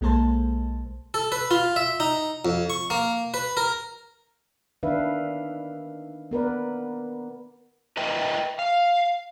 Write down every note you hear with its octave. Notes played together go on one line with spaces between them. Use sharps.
B1 G#3 A#3 A4 C5 A5
A4
B4
F4
E5
D#4
F2
C#6
A#3
B4
A#4
D#3 D4 B4 E5 F5
B3 A#4 B4 D5
A#4 B4 D#5 E5 G5
F5